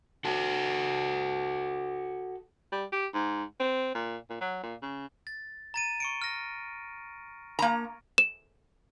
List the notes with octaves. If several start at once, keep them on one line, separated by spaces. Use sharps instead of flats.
F#4 A4
G3
G4
G#2
C4
A#2
A#2
F#3
A#2
C#3
A6
A#5 A6 D#7
C#6 C#7 D7
F6 A#6
A#3 A#5
E7